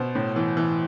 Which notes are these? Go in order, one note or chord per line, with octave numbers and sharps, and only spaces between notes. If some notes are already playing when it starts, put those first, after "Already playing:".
Already playing: B2 C5
A2
E3
E3